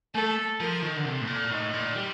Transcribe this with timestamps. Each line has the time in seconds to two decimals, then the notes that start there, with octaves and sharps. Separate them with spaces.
0.14 A3 A4
0.59 F3 A#4
0.83 D#3
0.96 D3
1.05 C3 A4
1.21 A2
1.27 A#2
1.51 A2 D#4
1.74 A#2
1.96 G3